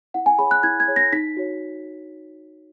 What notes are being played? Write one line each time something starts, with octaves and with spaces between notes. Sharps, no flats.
E4 F#5
G#5
G#4 C#5 B5
F#6
E4 G#6
G#6
G#4 C#5
A#6
D#4 B6
F#4 C#5